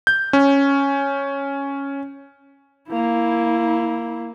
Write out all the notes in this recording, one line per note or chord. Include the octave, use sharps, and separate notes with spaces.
G6
C#4
A#3 E4